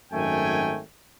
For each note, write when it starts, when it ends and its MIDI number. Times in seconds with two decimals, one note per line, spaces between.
0.12 0.80 32
0.12 0.80 42
0.12 0.80 51
0.12 0.80 57
0.12 0.80 79
0.12 0.80 80